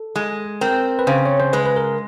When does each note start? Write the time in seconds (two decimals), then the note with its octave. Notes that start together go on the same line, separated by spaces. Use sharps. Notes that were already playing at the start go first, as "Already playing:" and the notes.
Already playing: A4
0.16 G#3
0.61 C4 A#4
0.99 B4
1.07 C#3 C5
1.26 C#5
1.40 C5
1.53 G#3 B4
1.66 B4
1.76 A#4